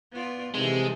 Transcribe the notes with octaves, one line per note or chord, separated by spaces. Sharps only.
B3 F4 D5
C3 D#3 E3 G#3 C4 A4